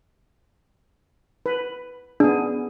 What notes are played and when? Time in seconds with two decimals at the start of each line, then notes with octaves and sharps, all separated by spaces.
1.46 B4
2.20 B3 D4 G#4